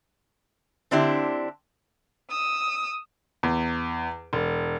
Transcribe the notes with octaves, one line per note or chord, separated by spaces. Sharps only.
D3 C4 D4 E4 G4
D#6 E6
E2
E1